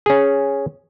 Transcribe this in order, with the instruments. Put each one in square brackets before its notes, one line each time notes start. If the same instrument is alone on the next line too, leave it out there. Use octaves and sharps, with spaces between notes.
[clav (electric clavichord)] C#4 G#4